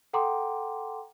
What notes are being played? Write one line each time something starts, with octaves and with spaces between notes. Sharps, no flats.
A4 F#5 G5 A#5 C6 D6